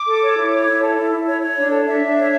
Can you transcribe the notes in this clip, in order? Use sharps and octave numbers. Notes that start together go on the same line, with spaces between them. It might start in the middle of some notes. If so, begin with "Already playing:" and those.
Already playing: D6
A4
C#5
E4
C#5
E4
A4
E4
E4
C#5
C#5
D4
A4
D4 E5
D4
C#5